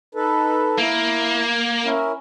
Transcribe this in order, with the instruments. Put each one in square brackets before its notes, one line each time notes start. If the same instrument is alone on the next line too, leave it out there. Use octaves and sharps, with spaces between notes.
[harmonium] D#4 A4 B4
[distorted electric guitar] A#3 [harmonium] E4
[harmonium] C#4 E4 A#4